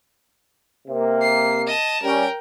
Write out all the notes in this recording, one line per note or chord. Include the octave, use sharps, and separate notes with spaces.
C3 A#3
C7
D#5 A5
G3 C#4 A#4 G5